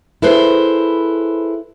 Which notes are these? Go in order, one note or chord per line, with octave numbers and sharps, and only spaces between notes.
E4 G#4 A4 B4 C5